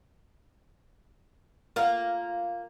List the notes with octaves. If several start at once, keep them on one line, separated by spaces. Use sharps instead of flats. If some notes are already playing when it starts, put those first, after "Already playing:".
A#3 F4